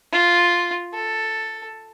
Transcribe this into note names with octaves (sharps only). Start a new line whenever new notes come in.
F4
A4